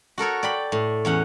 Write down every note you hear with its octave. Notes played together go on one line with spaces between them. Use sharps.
F#4 A4 A#4 C#5
D5 G5 B5
A2
E2 C#4 F#5